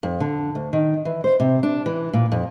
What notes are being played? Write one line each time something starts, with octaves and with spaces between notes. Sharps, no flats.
F2
D3
D2
D#3
E3
C5
C3
D4
E3
A#2
F2